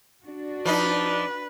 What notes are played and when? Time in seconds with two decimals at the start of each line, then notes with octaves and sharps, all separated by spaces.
0.23 D4 F#4
0.66 F3 D#4 B4 D5